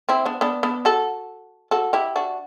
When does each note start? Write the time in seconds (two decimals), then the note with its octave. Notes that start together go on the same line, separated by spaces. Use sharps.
0.09 C4 E4
0.25 B3 D4
0.41 B3 D4
0.63 B3 D4
0.85 F#4 A4
1.71 F#4 A4
1.93 E4 G4
2.16 D4 F#4